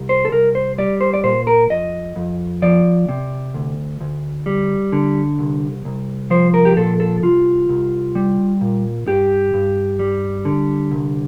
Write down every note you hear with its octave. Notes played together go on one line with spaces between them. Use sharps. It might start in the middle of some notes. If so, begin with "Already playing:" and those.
Already playing: C2
C5
A4
C2 A#4
C5
G3 D5
C5
D5
A#2 C5
A#4
F2 D#5
F2
F3 D5
C3
D2
D2
G3
D3
C2
C2
F3 C5
A#4
G4
A#2 A4
A4
C2 F4
C2
G3
A#2
G2 G4
G2
G3
D3
C2